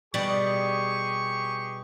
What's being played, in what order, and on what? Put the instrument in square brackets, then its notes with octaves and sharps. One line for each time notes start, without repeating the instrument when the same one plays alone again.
[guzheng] B2 G3 D5 [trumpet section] G4 G#4 C#6